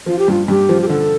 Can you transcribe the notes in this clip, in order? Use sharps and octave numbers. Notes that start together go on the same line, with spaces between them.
F3 F4
G4
G2 F4
G2 G4
F3
G4
D3 A4